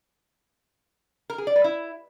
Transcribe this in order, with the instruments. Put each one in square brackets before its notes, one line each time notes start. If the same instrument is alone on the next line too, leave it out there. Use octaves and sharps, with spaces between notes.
[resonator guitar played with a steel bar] A#4
G#4
D5
B4
E4